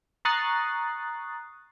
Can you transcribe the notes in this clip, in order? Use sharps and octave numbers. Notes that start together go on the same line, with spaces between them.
A#5 C#6 D#6 F#6 A6 C7